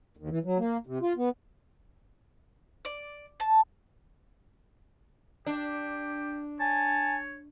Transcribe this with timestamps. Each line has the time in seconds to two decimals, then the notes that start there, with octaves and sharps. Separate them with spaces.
0.17 D#2
0.30 E3
0.44 F#3
0.58 A#3
0.87 C3
1.02 F4
1.17 B3
2.85 D5
3.40 A5
5.46 D4 G4
6.60 C#5 G#5 A5